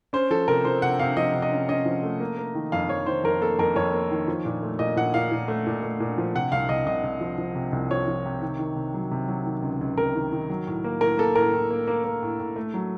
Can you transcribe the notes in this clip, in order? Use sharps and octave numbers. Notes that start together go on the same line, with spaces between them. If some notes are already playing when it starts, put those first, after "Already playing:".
C#4 C5
F3 A4
C3 A#4
F3 C5
C3 F#5
C3 F5
F3 D#5
C3
D#5
C#4
C#4 D#5
F3
A3
A#3
A#3
D#3
F2 F5
F2 C#5
D#3 C5
F2 A#4
A#3 A4
F2 A#4
F2 C#5
A#3
D#3
F3
A#2
A3
A#2 D#5
A#2 F#5
A#2 F5
A#2
A3
A#2
A3
A#2
F3
C3 F#5
C2 F5
C2 D#5
C2 D#5
C2
F3
F3
C3
C2
F3 C#5
F3
C3
D#3
D#3
C3
F#3
C3
F#3
D#3
C#2
C#2
C3 A#4
D#3
D#3
F#3
A2
A#3
A2 A#4
A#3 A4
A2 A#4
A2
A#3
A#3
A#3
A2
A2
A3
F#3